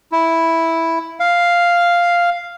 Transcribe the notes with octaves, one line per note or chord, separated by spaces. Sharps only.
E4
F5